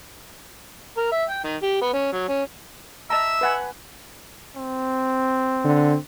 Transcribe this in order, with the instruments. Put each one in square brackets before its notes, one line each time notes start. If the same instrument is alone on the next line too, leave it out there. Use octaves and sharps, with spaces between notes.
[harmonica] A#4
E5
G5
D#3
G4
B3
C#4
F#3
C#4
[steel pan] D#5 A5 A#5 [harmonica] E5 E6
[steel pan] B4 F#5 G#5
[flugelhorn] C4
[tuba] D3